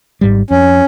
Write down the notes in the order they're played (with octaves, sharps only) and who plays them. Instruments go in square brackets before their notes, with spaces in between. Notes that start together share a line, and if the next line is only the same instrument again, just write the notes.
[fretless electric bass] G#1 G#2 G3
[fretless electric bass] F2 [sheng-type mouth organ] C#4